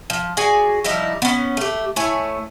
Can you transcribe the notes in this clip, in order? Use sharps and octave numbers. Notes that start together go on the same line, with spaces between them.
F3
F#4 G#4 D5 G#5
F3 G3 D#4 E4
B3 C#4
A3 G4
A3 E4 C#5 G#5